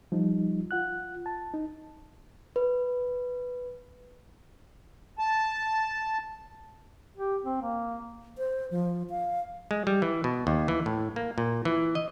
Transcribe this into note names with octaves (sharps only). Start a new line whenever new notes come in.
F3 G3 D#4
F4 F#5 F#6
A5
D#4
B4
A5
G4
C4
A#3
C5
F3
F5
G#3
G3
E3
B2
D#2
E3
A2
A#3
A#2
E3
D#5